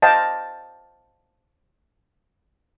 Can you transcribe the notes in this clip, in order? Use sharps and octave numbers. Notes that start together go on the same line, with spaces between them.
C5 D#5 F5 G5 A5